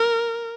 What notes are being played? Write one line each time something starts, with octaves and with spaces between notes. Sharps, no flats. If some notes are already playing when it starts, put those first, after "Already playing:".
Already playing: A#4